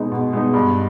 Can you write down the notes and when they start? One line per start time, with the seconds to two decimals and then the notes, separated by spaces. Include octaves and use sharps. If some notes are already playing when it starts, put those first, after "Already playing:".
Already playing: B2 G#3 B3 D#4
0.12 B2
0.33 G#3 B3 D#4
0.54 G2